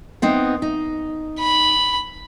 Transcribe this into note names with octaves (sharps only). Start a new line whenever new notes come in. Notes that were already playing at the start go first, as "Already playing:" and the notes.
B3 C4 D#4
D#4
B5